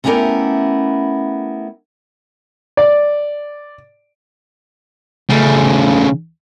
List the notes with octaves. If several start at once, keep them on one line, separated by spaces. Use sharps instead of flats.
A3 B3 C#4 E4 G4 A#4
D5
C#3 A3